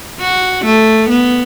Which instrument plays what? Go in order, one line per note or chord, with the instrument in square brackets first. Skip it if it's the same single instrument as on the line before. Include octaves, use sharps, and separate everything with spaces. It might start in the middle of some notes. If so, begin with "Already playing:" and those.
[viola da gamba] F#4
A3
B3